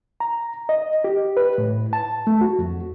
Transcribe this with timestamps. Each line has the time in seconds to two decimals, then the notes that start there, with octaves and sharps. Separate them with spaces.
0.20 A#5
0.69 D#5
1.04 G4
1.37 B4
1.58 A2
1.93 A5
2.27 A3
2.41 F#4
2.59 F2